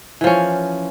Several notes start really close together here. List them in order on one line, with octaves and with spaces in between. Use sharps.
E3 F3 C#4